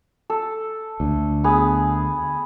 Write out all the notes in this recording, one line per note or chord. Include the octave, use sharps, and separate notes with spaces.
A4
D2
B3 G#4